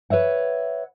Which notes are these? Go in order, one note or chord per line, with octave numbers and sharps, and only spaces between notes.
B4 C#5 E5 F#5